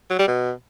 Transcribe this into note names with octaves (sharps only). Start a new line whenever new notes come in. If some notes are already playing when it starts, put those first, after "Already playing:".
F#3
G3
B2